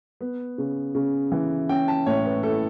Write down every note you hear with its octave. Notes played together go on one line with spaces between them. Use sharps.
B3
C#3
C#3
E3
C#4 G5
A5
A2 C#5
B4
E4 A4